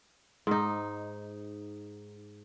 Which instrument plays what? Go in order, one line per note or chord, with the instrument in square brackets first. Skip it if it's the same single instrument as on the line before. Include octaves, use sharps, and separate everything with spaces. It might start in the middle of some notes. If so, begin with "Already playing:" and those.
[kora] G#2 D#4